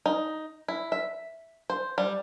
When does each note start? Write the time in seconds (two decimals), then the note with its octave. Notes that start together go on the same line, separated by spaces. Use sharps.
0.06 D#4
0.68 E4
0.92 E5
1.70 C5
1.98 G3